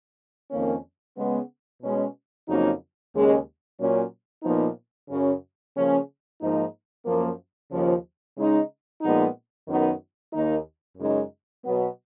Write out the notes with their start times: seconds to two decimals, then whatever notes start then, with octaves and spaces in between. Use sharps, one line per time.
0.51 F2 D#3 A#3 C#4
1.16 C#3 G#3 B3
1.81 B2 G#3 C#4
2.47 F2 C#3 F#3 A#3 D#4
3.13 D#2 C#3 G#3 C#4
3.79 A#2 F#3 C#4
4.43 A#2 F3 B3 D#4
5.09 F#2 C#3 F#3 C#4
5.75 C#3 F3 A#3 C#4
6.39 G#2 F3 A#3 D#4
7.06 F#2 F3 A#3
7.70 D#2 C#3 F3
8.36 C#3 G#3 D#4
9.01 A#2 F3 G#3 B3 D#4
9.67 F#2 D#3 F#3 B3 D#4
10.33 D#2 D#3 A#3 D#4
10.98 F#2 C#3 G#3 D#4
11.64 B2 F#3 B3